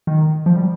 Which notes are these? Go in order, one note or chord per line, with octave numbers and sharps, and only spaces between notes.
D#3
F3
G3